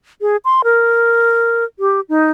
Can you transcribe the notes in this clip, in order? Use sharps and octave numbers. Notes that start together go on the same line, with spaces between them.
G#4
C6
A#4
G4
D#4